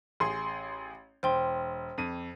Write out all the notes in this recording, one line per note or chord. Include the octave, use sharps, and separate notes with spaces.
A1 G#4 C6
E1 C5 G5 C6
F2 D#7